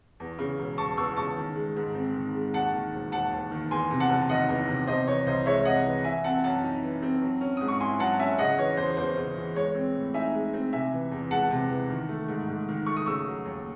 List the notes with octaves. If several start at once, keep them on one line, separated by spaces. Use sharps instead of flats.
E2
C#3
E1
E1 A5 C#6
E2 C#6 E6
C#3 A5 C#6
D#3
G#3
G#2
C4
D#3
G#3
D#2 F#5 A5
D#3
E1
E1 F#5 A5
D#2
D#3
E2 G#5 C6
C3
F#5 A5
F#1
D#3 D#5 F#5
E2
C3
C3 C5 D#5
E3 C#5
C2 C5 D#5
G#3 C#5 E5
C3 D#5 F#5
E3
E3 E5 G#5
C4 F#5 A5
F#2 F#5 A5
D#4
E3
C4
F#3
C#4
G#2 D#6
C#6
E4 G#5 C6
F#3 F#5 A5
C#4 E5 G#5
C#3 D#5 F#5
E3 C#5
E2 C5
E2 C5
C#3
E3
G#3 C#5
C4
A2
D#4 E5 G#5
G#3
C4
C3 E5 G#5
E3
E2
G#3 F#5 A5
C3
E3
D#3
A3
G#2
G#2
D#3
A3 C#6
D#6
C#3 C#6 E6
F#3
D#2